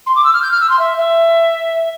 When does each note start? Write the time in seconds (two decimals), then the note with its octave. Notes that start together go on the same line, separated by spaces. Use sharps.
0.07 C6
0.16 D6
0.25 E6
0.33 F6
0.42 G6
0.51 F6
0.61 E6
0.70 C6
0.79 E5
0.98 E5